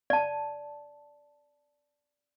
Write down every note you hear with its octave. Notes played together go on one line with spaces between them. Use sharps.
D5 A5